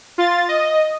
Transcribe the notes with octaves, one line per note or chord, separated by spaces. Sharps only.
F4 A6
D#5